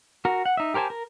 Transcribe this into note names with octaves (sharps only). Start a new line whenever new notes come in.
F#4 A#4
F#5
D#4 E5
G4 A#4 C5 G#5 A5
A#4